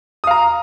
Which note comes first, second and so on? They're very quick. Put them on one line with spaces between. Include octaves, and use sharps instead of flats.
D#6 F5 A#5